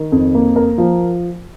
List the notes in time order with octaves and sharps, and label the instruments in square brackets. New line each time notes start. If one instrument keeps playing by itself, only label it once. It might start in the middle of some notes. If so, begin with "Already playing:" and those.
Already playing: [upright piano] D#3
F2
A#3
A#4
F3